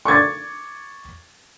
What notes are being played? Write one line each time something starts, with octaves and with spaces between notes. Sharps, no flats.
C#6 D6 G#6 A6